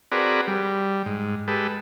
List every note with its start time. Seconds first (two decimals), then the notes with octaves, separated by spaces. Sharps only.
0.12 C4 F#4 G#4 A#4 B4 D5
0.48 G3
1.06 G#2
1.48 G#3 G4 A4 B4